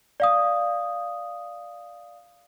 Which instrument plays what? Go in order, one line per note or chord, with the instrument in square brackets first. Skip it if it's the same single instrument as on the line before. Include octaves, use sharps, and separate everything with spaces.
[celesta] D5 F5 D#6